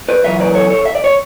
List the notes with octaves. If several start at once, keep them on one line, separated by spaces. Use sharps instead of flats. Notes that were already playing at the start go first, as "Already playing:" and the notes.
B4 D5
F#2 C#3 E3 E5
B4 D5
A4 C#5
A4 C#5
E5
D5
C#5